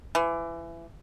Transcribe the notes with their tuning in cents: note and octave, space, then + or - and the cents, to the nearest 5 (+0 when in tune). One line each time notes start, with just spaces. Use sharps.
E3 +25